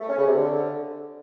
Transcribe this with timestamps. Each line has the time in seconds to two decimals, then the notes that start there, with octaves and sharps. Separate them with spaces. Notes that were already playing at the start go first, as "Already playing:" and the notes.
0.01 A3
0.09 C#4
0.18 C#3
0.27 C3
0.35 D3